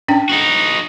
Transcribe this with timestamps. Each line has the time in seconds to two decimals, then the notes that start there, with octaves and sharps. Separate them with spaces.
0.08 C#4 D4 G5
0.29 D#4 F#4